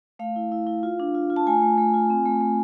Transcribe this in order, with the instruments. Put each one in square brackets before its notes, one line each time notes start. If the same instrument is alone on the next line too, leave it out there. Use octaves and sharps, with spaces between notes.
[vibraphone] A3 F5
E4
E4
E4
F4
D4
F4
F4
A5
A3 G#5
A3
A3
F4
C4
A3
A3